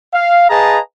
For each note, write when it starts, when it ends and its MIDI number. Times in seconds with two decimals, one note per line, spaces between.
0.13 0.47 77
0.49 0.79 68
0.49 0.79 71
0.49 0.79 75
0.49 0.79 77
0.49 0.79 81
0.49 0.79 82